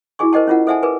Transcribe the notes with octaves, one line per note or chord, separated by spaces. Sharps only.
E4 F#4 G#4 G#5 C#6
A#4 C5 D#5 G5 A5
C#4 E4 F4 A#4 F#5
A4 C5 E5 F#5 G#5 A5
G#4 A#4 B4 G#5